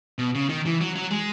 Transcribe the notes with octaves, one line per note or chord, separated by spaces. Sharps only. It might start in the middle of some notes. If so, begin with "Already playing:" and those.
B2
C#3
D#3
E3
F#3
F#3
G#3